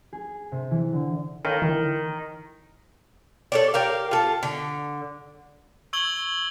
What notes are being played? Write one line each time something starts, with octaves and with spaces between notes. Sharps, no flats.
G#4
C3
E3
D3
D#3 A4 C#5 F5
D3 E3 E4 A#4
A4 C#5 D5
G4 A#4 F5
F4 A4
D3
C#6 E6 G#6 F#7 G7